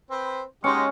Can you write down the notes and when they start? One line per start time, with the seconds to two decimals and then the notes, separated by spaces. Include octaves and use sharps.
0.11 C4 B4 C5
0.64 G#3 C#4 D#4 F#4 G4 C6 C#6 C#7